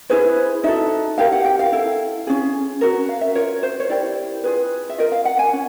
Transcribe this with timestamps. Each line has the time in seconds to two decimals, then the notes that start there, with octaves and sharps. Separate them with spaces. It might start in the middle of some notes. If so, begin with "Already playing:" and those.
0.10 E4 G#4 B4 C5
0.64 D#4 F#4 A4 E5
1.18 E4 G4 A#4 F5
1.32 F#5
1.45 G5
1.59 F5
1.72 E4 A4
2.27 C#4 F4 G#4
2.81 C#4 F#4 A#4
3.09 F5
3.21 E5
3.35 F4 A#4 C#5
3.63 C5
3.80 C#5
3.89 E4 G4 A#4 D5
4.44 F4 G#4 B4
4.89 E5
4.98 F4 A#4 D#5
5.12 F5
5.25 F#5
5.39 G#5
5.53 C#4